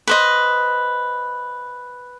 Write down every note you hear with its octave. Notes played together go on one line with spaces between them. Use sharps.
B4 C5 D#5